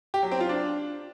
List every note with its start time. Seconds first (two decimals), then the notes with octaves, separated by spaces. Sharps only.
0.14 G4
0.23 F#3
0.32 C4
0.40 F4
0.49 D4